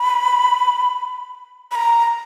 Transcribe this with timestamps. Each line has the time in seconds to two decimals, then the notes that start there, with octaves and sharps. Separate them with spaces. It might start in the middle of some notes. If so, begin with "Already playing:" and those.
Already playing: B5
1.71 B5
1.75 A#5